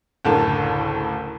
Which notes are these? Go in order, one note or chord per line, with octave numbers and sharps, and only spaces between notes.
F#1 D2 A2 A#4 A5